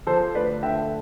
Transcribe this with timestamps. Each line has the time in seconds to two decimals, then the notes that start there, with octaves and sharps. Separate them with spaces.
0.07 F3 A4 C5
0.35 D2 B4 D5
0.63 D3 E5 G5